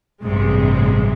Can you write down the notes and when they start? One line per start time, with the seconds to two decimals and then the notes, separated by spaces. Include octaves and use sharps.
0.23 A1 G2 C3 G#3